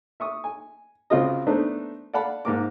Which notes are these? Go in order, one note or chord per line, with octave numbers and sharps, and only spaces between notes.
E5 C#6 D#6
G#5
C#2 C4 F4 F#4 D#5
A3 B3 D4 D#4 C5
D5 F5 F#5 A5 B5
G#2 A#3 D6